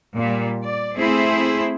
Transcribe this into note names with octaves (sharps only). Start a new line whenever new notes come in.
A#2 G3
D5
A3 C4 E4 G#4 C5